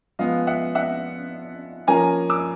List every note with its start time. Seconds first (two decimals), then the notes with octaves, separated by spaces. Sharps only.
0.19 F3 G#3 B3 D#5 F5
0.47 E5 F#5
0.75 E5 F#5
1.87 F3 A#3 C#4 G#5 A#5
2.30 D6 E6